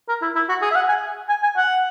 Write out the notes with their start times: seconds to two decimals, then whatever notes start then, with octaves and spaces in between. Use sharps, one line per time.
0.08 A#4
0.22 E4
0.35 E4
0.49 F#4
0.62 G#4
0.71 E5
0.75 F#5
0.89 G#5
1.29 G#5
1.43 G#5
1.57 F#5